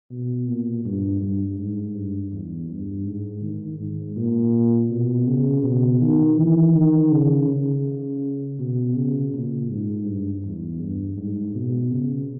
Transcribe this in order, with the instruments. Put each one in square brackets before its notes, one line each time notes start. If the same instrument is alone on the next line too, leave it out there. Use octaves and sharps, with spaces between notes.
[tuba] B2
A#2
G2
G2
G#2
G2
E2
G2
G#2
D#3
G#2
A#2
B2
C#3
B2
D#3
E3
D#3
C#3
C#3
B2
C#3
A#2
G#2
G2
E2
G2
G#2
B2
C#3